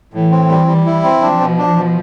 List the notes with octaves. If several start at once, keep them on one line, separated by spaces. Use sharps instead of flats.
A2 E3
C4
G3
G3
E4
C4
F3 D4
B2
D4
B2